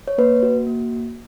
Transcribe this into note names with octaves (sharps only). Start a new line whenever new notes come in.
C#5
A#3 B4
F#4
A#3